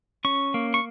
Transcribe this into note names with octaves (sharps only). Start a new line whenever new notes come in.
C#4 C#6
A#3
C#6